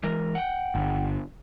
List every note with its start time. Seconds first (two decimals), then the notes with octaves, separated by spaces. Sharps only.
0.03 E3 G#3 A#4
0.35 F#5 G5
0.75 G1